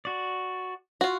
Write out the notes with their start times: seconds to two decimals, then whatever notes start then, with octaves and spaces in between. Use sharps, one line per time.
0.05 F#4 D5
1.01 F4 F#4